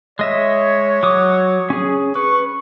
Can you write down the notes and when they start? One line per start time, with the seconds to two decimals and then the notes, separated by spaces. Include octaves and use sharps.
0.19 G#3 C#5 D#5 E5
1.03 F#3 D6 D#6
1.70 C#4 G#4
2.16 B4 C#6